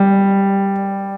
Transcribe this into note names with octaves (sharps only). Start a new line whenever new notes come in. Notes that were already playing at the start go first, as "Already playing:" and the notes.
Already playing: G3